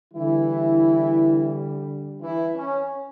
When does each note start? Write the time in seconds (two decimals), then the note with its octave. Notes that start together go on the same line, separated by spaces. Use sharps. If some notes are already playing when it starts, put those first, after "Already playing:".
0.13 D3 E3 G3 E4
2.21 E3 E4
2.56 C#4